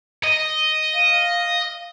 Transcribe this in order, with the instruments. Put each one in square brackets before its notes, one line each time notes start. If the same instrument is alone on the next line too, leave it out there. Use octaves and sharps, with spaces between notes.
[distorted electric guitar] D#5
[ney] F5